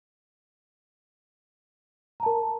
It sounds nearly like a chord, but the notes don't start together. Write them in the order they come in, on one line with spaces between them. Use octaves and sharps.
A#5 A5 A#4